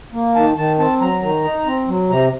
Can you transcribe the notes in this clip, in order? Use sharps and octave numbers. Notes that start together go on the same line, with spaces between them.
A#3
D#3 A5
D#3 A5
C4 A5
F#3 A#5
D#3
D#4
C4
F#3
C3 A#5